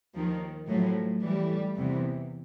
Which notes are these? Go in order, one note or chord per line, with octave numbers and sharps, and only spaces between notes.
D#2 D#3 F3
A2 F3 F#3
A2 E3 G3
E2 C3 E3